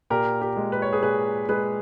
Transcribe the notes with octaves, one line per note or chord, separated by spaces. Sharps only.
A#2 G4 A#4
G4 A#4
G#3
B4
C#5
G#4 B4
A#2 G#4 B4
G#3 G#4 B4